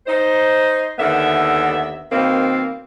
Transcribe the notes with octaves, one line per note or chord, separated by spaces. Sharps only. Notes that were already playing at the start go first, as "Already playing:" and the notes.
D#4 C5
D#2 D3 D#3 B3 E5
B2 D#3 A#3 C4